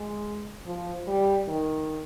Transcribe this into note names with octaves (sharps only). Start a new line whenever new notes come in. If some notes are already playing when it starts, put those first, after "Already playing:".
Already playing: G#3
F3
G3
D#3